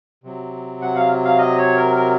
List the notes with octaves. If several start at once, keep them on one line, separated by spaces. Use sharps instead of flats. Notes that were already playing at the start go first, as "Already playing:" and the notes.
C3 F#3
F#5
F5
F5
D#5
C#5
A#4
A#4